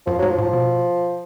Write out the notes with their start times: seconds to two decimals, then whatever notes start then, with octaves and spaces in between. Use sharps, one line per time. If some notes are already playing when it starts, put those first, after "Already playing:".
0.07 F#2 F3
0.19 F#3
0.22 G#2
0.30 F3
0.38 A2
0.42 F3
0.53 B2